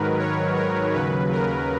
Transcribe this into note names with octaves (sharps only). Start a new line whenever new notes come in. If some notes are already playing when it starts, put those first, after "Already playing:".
Already playing: G#2 D#3 F#3 A#4 B4
C#5
A#4
D#2 C#3 F#3 B4
A#4